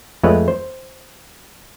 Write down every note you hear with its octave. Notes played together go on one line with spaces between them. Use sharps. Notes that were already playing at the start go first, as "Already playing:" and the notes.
F2 G#3 A3 B4 C#5
C5